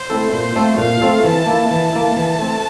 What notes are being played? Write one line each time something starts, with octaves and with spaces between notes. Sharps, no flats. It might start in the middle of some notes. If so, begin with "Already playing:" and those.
Already playing: C5
A3 C4 E4 A4
A#2 C5
A3 C4 F4 A4
A#2 F5
A3 C4 F4 A4
E3 A5
A#3 E4
E3 A5
A#3 E4
E3
A3 C4